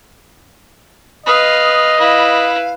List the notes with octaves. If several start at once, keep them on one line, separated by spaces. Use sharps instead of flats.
B4 D#5 F5 D#6
E4 B4 F5